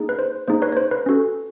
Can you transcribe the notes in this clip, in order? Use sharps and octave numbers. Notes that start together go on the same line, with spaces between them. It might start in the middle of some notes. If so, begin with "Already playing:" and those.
Already playing: A#3 D#4 G#4
B4
C5
A#3 D#4 G#4 C5
B4 C#5
C#5
C5
B4
C#4 F#4 A4